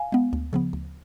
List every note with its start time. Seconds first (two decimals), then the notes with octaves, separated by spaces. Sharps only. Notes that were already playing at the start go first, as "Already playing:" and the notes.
Already playing: F5 G#5
0.12 G#3 B3
0.33 D2
0.53 C#3 F3 B3
0.73 D2